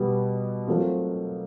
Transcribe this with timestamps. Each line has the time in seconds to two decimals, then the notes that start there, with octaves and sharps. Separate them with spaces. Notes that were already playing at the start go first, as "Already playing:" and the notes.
Already playing: B2 G3 B3
0.67 F#3 A3 C4 F4 A#4